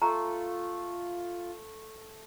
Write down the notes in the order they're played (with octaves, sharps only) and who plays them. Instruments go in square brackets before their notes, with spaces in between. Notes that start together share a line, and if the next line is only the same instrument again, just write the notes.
[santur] A3 [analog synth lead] F4 [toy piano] A#5